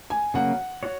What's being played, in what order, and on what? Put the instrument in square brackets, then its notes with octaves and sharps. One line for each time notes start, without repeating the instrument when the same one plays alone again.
[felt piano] G#5
[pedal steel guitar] C#3 F#3 A#3 [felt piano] F#5
[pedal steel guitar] F#4 C#5